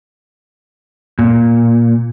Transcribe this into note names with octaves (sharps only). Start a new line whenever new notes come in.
A#2